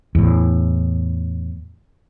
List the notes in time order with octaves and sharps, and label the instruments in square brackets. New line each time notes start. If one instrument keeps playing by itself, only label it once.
[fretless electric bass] E2 A2